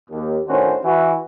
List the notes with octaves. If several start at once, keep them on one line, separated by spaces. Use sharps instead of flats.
D#2
A2 D#3 C#4 D4 F#4 C5
E3 F#4